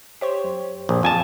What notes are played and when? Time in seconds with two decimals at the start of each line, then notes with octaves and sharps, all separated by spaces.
0.21 G4 C5 C#5
0.44 F#2
0.89 A#1
1.03 F2 G#5 A5